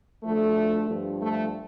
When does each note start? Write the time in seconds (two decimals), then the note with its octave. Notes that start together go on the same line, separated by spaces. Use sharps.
0.24 D2 D3 F3 A3
0.89 G2 F3
1.22 A3